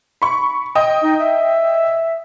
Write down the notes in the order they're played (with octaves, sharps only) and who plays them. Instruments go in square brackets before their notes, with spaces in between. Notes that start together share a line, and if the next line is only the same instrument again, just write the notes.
[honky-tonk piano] B5 C#6
D#5 G5 D#6
[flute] D#4
E5